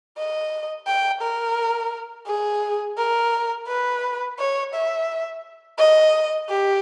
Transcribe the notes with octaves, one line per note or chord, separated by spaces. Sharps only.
D#5
G5
A#4
G#4
A#4
B4
C#5
E5
D#5
G4